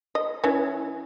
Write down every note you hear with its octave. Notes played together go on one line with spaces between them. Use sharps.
D#5
E3 C#4